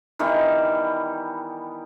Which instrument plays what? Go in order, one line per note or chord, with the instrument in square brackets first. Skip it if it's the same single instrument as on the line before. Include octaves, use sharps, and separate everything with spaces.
[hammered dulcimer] D#3 E3 G3 B3